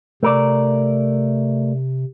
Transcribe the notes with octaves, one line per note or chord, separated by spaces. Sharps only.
C3 A3 A#4 D5